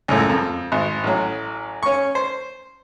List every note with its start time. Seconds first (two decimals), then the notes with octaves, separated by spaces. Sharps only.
0.08 C#2 F#2 A2
0.29 F2
0.72 G#1
1.04 A1 F#3
1.83 C#4 C#6
2.15 C5